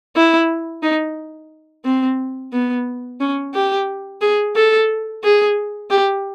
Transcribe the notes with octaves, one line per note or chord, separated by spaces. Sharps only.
E4
D#4
C4
B3
C#4
G4
G#4
A4
G#4
G4